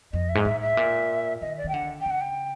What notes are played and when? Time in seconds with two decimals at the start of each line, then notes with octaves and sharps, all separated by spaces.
0.13 F2 D#5
0.29 E5
0.35 G#2
0.45 A2 E5
0.61 E5
0.77 A#2
1.41 D#3 D#5
1.58 D5
1.64 D#3 G5
1.73 D3 F#5
2.01 G5
2.06 C#3 F#5
2.21 G5